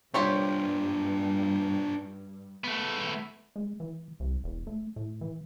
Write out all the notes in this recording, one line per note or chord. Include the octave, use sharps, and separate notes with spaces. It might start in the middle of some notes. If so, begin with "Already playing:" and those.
G2 D4 F4 G4 C5 C#5
A3 B3
G#3
E3
C2
E1
A3
A2
E3